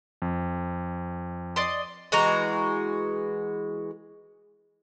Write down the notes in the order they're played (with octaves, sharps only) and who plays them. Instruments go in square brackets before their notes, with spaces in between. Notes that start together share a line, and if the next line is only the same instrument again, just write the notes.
[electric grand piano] F2
[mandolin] D5 D#5 C6
[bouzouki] E3 G#3 F#4 A#5